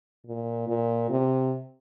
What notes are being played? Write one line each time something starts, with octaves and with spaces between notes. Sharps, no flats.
A#2
A#2
C3